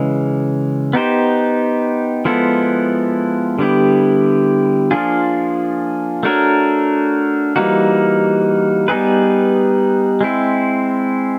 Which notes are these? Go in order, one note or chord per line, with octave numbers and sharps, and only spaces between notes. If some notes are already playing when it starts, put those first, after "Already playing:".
Already playing: C#3 E3 G#3
B3 D#4 G4 C5
F3 G#3 B3 E4 A4
D3 G3 B3 E4 G4
F3 A#3 D4 F4 G#4
A3 D4 F#4 A#4 C#5
E3 G3 A#3 D#4 F#4
G3 B3 D#4 G#4 B4
G#3 C4 E4